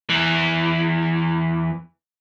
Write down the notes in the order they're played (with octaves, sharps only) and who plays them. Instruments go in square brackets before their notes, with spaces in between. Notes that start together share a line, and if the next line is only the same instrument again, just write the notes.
[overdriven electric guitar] E2 E3